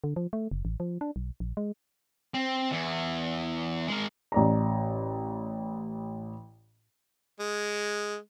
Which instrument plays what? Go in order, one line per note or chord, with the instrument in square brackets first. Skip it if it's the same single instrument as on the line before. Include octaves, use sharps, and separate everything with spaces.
[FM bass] D3
F3
A3
F#1
A1
F3
D4
B1
A#1
G#3
[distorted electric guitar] C4
E2 E3
G#3 A#4
[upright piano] A1 D5 A#5
[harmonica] G#3